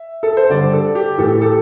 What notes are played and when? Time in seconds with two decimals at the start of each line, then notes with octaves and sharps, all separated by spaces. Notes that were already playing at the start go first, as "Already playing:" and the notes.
Already playing: E5
0.23 A4
0.37 C5
0.50 G2 D3 D5
0.73 A4
0.95 G4
1.18 A2 E3 A4
1.30 G4
1.41 A4